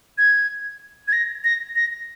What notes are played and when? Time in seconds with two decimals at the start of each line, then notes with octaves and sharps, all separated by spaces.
0.18 G#6
1.08 G#6
1.13 A#6
1.44 A#6
1.76 A#6